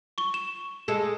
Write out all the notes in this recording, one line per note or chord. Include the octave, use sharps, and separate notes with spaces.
C#6 G7
E7
G#3 A4